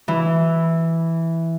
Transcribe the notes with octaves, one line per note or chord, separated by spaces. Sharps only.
E3